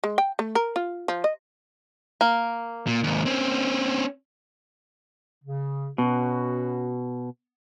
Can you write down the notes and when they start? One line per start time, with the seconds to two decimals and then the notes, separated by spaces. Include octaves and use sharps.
0.04 G#3
0.18 G5
0.39 A3
0.55 A#4
0.76 F4
1.08 F3
1.24 D#5
2.21 A#3
2.87 A#2
3.04 D#2 G#2
3.26 C4 C#4
5.44 C#3
5.98 B2 B3 C#4 F#4